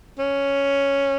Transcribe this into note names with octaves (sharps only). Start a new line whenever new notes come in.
C#4